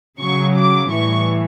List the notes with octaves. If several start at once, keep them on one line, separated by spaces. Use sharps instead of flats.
C#3 F#3 C#6
D6
A2 E3 G3 C#6